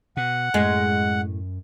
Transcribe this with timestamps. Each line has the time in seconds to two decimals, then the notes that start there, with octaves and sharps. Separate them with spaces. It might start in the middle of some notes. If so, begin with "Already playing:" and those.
0.17 B2 F#5
0.54 F#2 A2 G#3